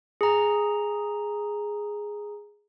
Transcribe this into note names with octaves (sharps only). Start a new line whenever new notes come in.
G#4 A#5